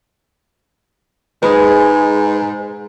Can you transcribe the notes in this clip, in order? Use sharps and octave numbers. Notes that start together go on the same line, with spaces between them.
G#2 G#3 G#4 B4 B5